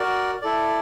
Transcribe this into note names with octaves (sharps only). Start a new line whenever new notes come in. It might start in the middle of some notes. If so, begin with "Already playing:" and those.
Already playing: F#4 A#4 D5
E4 A4 D5